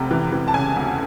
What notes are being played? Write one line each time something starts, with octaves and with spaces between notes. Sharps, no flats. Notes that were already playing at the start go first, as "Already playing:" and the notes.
Already playing: F1 C3
E3
E3
A5
C#3 G#5
D2